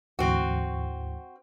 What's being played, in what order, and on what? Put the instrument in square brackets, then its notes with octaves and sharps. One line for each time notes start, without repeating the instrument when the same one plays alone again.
[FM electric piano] D2 G#2 E3 [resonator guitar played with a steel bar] C4 F#4